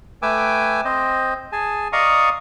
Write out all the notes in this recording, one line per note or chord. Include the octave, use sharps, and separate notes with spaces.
A3 B4 G5 G#5 D6 E6
C4 C5 D#5
G#4 G#5 A5
D5 D#5 F5 A#5 C#6 D#6